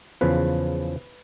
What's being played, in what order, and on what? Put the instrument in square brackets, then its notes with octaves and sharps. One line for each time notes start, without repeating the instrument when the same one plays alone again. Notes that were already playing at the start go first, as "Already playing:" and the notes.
[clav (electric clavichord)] E2 C#3 F3 B4